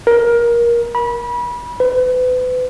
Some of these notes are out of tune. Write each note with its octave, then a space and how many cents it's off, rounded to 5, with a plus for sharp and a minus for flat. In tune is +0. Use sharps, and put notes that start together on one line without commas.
A#4 +20
B5 -30
B4 +35